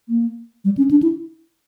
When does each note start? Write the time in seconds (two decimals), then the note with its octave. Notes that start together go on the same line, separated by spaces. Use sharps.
0.09 A#3
0.65 G3
0.78 C#4
0.91 D4
1.03 E4